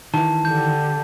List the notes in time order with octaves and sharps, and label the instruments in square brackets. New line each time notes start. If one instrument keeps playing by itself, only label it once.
[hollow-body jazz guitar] D#3 E3 [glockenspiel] A5
[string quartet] D3 G4 [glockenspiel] G6